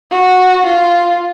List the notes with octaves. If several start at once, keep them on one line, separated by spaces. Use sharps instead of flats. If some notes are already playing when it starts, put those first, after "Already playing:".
F#4
F4